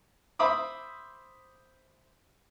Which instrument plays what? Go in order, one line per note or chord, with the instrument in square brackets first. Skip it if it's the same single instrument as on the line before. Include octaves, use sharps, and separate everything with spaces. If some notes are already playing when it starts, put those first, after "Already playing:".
[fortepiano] C5 E5 B5 D6 D#6